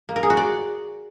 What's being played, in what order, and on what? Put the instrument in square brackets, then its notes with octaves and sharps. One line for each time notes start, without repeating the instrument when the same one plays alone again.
[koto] A#3
A#4
G#4
F#4
D5